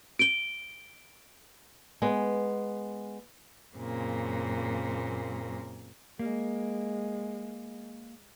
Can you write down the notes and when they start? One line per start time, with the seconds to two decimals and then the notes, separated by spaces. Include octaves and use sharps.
0.19 D7 G7
2.02 G#3 B3
3.76 F#2 A#2 C#3 A#3 C4
6.19 G#3 A#3